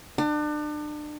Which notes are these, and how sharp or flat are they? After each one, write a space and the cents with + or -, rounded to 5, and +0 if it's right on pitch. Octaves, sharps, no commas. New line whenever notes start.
D4 +35